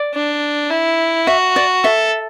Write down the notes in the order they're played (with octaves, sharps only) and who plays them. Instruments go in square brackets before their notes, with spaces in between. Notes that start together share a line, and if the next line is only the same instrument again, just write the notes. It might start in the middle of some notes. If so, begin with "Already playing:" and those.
Already playing: [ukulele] D5
[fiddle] D4
E4
[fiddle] F#4 [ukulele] E5
[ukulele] D5
[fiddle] A4 [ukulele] E5